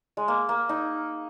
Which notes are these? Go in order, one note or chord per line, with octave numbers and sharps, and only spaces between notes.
G#3
A#3
A#3
D#4